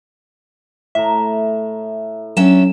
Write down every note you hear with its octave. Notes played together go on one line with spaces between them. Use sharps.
A2 E5 A#5
F#3 C#4 D4 E5 E7